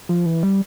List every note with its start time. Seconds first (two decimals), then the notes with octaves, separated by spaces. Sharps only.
0.09 F3
0.26 E3
0.43 G3